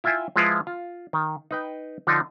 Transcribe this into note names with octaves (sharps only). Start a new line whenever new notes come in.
E4 F4 E5 G5 G#5
F3 G#3 E4 F4 B4
F4
D#3
D#4 B4 G5
D3 F3 D4 D#4